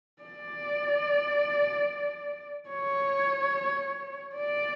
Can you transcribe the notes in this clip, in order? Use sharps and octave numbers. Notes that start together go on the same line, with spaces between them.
D5
C#5
D5